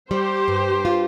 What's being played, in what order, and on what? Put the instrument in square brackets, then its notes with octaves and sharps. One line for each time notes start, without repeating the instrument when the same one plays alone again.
[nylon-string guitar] G3 [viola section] G4 C5
[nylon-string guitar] G2
F4